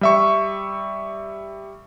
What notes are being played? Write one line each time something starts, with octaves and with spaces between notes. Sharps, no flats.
G3 E5 C#6